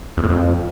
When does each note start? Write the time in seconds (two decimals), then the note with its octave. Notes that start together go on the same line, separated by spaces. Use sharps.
0.17 E2
0.23 A2
0.29 F2